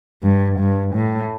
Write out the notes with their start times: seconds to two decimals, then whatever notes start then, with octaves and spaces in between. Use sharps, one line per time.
0.23 G2
0.58 G2
0.95 A2